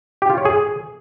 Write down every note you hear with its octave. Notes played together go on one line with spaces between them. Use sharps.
G4
F4
C#5
G#4